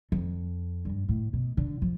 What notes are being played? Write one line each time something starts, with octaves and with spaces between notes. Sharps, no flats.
F2
G2
A2
B2
D3
F3